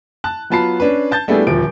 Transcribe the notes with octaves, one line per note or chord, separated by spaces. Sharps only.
A5 F#6
F#3 B3 F4 A5 B5 C7
C#4 D4 B4
A5 G6 A6
G3 A3 B3 D4 E4 G#4
D#1 D2 F3 D7